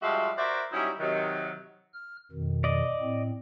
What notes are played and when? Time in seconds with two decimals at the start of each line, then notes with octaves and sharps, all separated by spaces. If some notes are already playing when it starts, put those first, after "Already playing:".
0.03 F3 G3 G#3 F#4 E5 F5
0.38 F#4 A#4 C5 D5 E5
0.73 F#3 G3 C#4 D#4 E4
1.00 C3 D#3 F#3
1.93 F6
2.32 F2 B2 D#3
2.64 D5 D#5
3.00 A2 C4